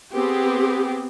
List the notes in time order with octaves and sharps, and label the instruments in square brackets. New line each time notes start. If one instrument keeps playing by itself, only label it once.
[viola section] B3 C4 G4 G#4